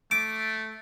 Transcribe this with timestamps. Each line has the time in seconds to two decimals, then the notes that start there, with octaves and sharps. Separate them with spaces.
0.11 A3 D6